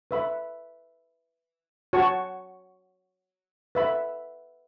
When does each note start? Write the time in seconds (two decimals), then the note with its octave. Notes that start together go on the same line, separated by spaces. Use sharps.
0.11 B4 E5 B5
1.93 F#4 C#5 A5 C#6
3.75 B4 E5 B5